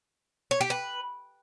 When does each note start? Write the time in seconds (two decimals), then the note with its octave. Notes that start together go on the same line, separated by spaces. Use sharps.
0.51 C#5
0.61 G4
0.70 B4